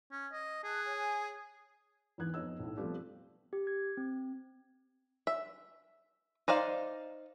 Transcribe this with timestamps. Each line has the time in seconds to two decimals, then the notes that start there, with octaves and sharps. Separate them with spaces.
0.11 C#4
0.33 D#5
0.64 G#4 A5 F#6
0.85 C#5 G#5
2.18 E2 G#2 E3 B4 F#6 G#6
2.34 F2 B3 D#4 C#5 D#5 E6
2.59 B1 A2
2.77 F3 G3 A3 B3 C4
3.53 G4
3.67 G#6
3.97 C4
5.27 E5
6.48 D#4 C5 D5 F5